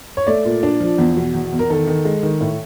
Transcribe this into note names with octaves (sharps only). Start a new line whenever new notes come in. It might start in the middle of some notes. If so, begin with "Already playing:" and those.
C#5
A3 D5
A#2
D4
F3
E2
B2
E2
E2
A#4
D#3 A4
D#3
G#3
D#3
A2